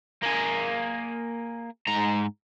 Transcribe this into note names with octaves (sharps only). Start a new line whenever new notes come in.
A#3 G#4
G#2 A#5